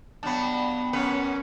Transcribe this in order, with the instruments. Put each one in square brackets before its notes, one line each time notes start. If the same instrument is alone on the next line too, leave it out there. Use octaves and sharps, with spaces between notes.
[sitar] G2 F#3 [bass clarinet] B3 [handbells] A5 B5
[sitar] F#2 B4 [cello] C#4